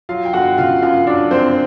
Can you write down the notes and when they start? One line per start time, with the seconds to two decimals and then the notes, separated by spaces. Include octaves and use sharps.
0.09 F#3 F4 F5
0.25 G5
0.33 G1 F#4 F#5
0.58 C#3 F4 F5
0.82 F#2 F4 F5
1.07 F#3 D4 D5
1.31 G1 C4 C5